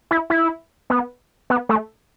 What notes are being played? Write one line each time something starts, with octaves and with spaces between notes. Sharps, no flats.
E4
E4
B3
B3
A3